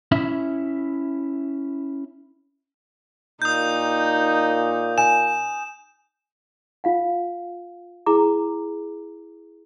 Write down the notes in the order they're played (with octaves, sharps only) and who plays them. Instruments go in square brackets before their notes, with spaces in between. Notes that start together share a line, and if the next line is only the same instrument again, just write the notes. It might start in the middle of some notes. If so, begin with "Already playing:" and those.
[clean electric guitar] C#4 E4 E5
[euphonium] A#2 [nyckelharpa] D#4 [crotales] D#6 G6
[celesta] G#5 [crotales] E7
[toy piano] F4 F5 F#5
E4 G#4 A#5 D6